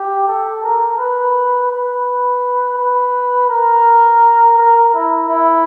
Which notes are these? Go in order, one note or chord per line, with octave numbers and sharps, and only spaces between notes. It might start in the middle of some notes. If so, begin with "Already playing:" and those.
Already playing: G4
A4
A#4
B4
B4
B4
A#4
A#4
E4
E4